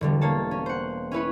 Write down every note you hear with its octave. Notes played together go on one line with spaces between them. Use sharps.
E1 D3 G3
A#3 C#5 A5
C#4
C5 F#5
C#4 E4 B4 C#5